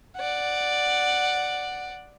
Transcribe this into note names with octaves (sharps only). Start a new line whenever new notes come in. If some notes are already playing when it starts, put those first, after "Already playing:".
D5 F#5